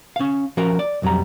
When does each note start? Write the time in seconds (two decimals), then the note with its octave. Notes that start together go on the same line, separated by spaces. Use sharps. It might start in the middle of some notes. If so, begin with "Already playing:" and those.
0.16 C#4 F5
0.57 F3 C#4 F#4 A#4
0.79 D5
1.02 B1 F2 F#3 G3 A#5